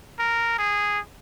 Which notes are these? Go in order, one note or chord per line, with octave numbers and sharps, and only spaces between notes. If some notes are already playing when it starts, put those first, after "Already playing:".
A#4
G#4